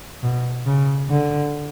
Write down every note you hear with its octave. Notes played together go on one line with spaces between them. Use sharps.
B2
C#3
D3